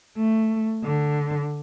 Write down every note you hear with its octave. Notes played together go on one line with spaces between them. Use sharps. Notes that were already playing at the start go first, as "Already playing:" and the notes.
A3
D3